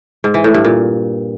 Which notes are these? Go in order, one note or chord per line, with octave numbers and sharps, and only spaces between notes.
G#2
E3
A2
G2
A#2